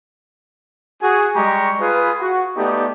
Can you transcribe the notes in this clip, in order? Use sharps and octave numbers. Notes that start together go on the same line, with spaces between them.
F#4 G#4
G3 G#3 G4 A#5 C#6
F4 G#4 B4
F#4
A3 B3 D#4 G4 D5